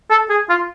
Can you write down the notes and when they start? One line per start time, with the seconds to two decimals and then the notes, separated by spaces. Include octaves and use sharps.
0.10 A4
0.30 G#4
0.49 F4